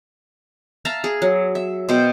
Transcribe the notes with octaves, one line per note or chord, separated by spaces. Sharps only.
E5 F5 A5 A#5
G#4
F#3
E5
B2 C5 G5